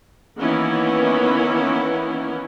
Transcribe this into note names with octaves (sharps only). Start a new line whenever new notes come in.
D#3 E3 A#3 B3 C#4 E4